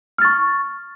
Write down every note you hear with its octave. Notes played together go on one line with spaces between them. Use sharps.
C#6 F6 A6